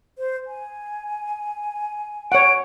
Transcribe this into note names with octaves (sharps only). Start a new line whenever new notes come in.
C5
G#5
C#5 F#5 D7